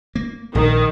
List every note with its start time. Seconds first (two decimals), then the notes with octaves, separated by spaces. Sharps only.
0.16 A#3
0.55 A#1 D#3